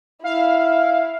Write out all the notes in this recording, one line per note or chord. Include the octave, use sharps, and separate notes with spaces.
E4 F5